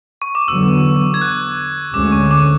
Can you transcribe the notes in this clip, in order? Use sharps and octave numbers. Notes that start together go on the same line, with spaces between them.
C#6
D6
E2 D3 F#3 B3 E6
G#6
F#6
D2 D3 G#3 C#4 D6
C#6
D6